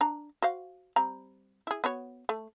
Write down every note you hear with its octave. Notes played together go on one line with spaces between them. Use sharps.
D4 A#5
F#4 C5 F5
G3 C4 A#5
E4 G#4
B3 F#4 C#5
A3